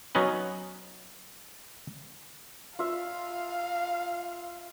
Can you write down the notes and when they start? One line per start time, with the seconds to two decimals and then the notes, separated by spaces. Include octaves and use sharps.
0.15 F#3 B3 C#4 D#4 B4
2.79 F4 E5 F5